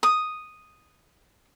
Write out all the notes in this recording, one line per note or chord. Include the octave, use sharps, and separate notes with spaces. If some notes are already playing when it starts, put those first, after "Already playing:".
D#6